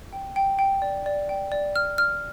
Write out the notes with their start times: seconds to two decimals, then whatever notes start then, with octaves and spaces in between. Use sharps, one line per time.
0.13 G5
0.36 G5
0.59 G5
0.82 D5
1.06 D5
1.29 G5
1.52 D5
1.76 F6
1.98 F6